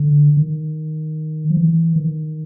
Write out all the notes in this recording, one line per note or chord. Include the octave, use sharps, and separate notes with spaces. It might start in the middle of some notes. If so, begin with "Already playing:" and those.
Already playing: D3
D#3
F3
E3
D#3